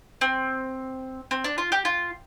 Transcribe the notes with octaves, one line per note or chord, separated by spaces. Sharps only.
C4
C4
D4
F4
G4
F4